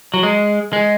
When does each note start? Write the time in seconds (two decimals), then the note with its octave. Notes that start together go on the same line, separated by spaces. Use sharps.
0.14 F#3
0.23 G#3
0.73 G#3